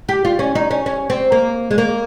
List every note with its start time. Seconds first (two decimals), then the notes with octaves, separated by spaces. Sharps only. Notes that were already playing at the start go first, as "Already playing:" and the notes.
0.09 G4
0.25 F4
0.39 C#4
0.55 D#4
0.71 C#4
0.86 C#4
1.10 C4
1.32 A#3
1.71 G#3
1.78 A#3